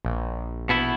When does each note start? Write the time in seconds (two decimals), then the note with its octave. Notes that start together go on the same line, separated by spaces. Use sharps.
0.05 A#1
0.69 B2 B3 E4